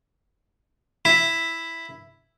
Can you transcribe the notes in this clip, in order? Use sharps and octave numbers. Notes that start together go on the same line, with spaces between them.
E4